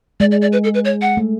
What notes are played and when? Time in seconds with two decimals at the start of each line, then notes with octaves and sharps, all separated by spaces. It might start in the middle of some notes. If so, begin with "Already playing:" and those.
0.20 G#3 D5
0.31 D5
0.42 D5
0.53 B4
0.64 A4
0.74 B4
0.85 C#5
1.02 F#5
1.17 A3